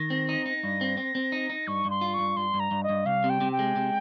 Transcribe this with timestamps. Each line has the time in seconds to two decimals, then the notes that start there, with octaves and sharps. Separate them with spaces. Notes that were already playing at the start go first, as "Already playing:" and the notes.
Already playing: D#3 A#6
0.10 C4
0.29 D#4
0.46 D#4
0.63 G2
0.81 C4
0.97 C4
1.15 C4
1.32 D#4
1.50 D#4
1.67 G2 C#6
1.85 G2
1.90 C6
2.01 F4
2.14 G2 C#6
2.37 G2 C6
2.54 G2
2.60 A#5
2.71 G2
2.83 D#5
2.89 G2
3.06 C2 F5
3.24 C3
3.30 G5
3.41 C3
3.52 G5
3.59 G#3
3.76 C3